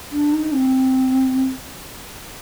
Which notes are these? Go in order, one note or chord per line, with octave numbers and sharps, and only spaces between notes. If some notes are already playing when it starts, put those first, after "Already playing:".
D4
D#4
C4